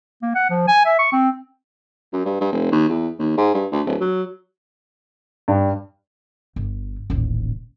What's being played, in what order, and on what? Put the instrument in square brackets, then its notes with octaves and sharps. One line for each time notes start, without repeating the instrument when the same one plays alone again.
[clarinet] A#3
F#5
F3
G#5
E5
C#6
C4
[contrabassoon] F#2
G2
G2
F1
D#2
E2
D#2
G#2
G2
D2
D1
F#3
[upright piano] G2
[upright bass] G1
D#1 A1